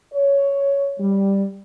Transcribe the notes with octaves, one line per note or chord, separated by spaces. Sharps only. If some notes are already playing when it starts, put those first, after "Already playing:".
C#5
G3